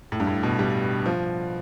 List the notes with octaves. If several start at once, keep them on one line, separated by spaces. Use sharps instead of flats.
A2
G2
A2
B2
G3
F3